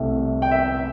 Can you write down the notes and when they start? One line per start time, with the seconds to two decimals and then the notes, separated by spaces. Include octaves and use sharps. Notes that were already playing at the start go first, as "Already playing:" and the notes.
Already playing: C2 C3 A3
0.42 G5
0.51 E5
0.60 G5